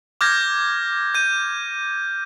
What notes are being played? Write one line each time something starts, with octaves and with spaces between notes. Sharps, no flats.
D6 F6 G6 G#6 A#6
G6 D#7